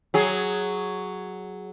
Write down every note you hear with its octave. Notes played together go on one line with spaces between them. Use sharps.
F#3 G#4